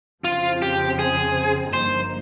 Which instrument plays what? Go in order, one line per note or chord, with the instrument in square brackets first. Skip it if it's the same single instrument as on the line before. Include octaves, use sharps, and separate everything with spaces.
[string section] F2 C#3 F3 C4 [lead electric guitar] F4
[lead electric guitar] G4
G#4
[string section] G1 G2 F3 A#3 D#4 [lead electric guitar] C5